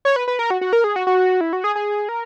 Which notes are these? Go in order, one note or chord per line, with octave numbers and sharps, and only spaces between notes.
C#5
B4
B4
A#4
F#4
F#4
A#4
G#4
F#4
F#4
E4
F#4
G#4
G#4
A#4